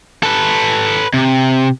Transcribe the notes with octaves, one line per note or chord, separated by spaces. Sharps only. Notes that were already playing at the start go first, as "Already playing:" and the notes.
A4 B4
C3